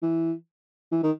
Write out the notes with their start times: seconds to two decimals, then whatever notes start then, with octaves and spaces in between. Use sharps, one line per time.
0.02 E3
0.91 E3
1.03 D#3